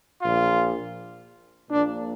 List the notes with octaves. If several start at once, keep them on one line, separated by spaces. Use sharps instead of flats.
A#1 A#2 F4
A#1 A#2 D4